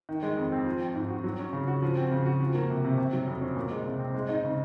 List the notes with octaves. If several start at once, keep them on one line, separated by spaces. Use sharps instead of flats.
D#3
G#3
F2
C4
F3
C4
G#2
F#4
F#3
C#4
C#3
F#4
F3
C4
C#3
F#4
F3
A#3
C3
C3
C3
F#3
F2
C#4
A#2
G#3
C2
C4
G#3
D#4
C#3